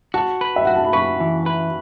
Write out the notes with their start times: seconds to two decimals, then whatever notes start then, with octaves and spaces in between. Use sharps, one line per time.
0.14 F#4 A5
0.41 B4
0.56 E5
0.65 F#4 F#5
0.75 A5
0.85 B5
0.93 B4 C#6
1.20 E3
1.46 B4